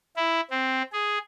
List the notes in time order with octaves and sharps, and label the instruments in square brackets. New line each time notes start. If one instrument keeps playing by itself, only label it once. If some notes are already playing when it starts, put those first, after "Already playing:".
[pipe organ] E4
C4
G#4